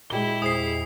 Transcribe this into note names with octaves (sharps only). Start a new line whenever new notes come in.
A#2 G#3 E4 G4 G7
E2 G#4 C5 D#6 C7